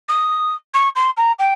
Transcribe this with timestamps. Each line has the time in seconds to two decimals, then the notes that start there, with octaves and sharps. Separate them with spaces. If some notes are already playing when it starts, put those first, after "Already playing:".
0.09 D#6
0.74 C#6
0.96 C6
1.17 A#5
1.39 G5